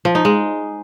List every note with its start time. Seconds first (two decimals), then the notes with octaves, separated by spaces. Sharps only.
0.05 F3
0.15 D#4
0.25 G#3